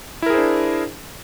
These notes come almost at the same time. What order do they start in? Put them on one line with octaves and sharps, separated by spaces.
E4 A#4 G#4 C5 D4